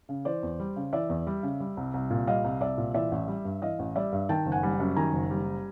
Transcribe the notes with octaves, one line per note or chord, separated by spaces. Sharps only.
C#3
E3 C5 D5
E2
G3
C#3
E3 D5 E5
E2
G3
C#3
G3
C2
C2
A#2
G3 D#5 F5
C2
C2 D5 E5
A#2
E3 D5 E5
A1
G3
G2
E3 D#5 F5
A1
G3 D5 E5
G2
D#3 G5 A5
F#1
F#5 G#5
G3
F#2
D#3 G#5 A#5
F#1
G3